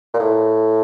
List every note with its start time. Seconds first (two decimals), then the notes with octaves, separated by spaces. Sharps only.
0.14 A#2
0.19 A2